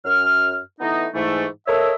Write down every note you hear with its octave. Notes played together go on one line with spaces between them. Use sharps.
F#2 F6
E3 A3 B3 D#4
G#2 E3 A3
A4 A#4 C#5 D#5 E5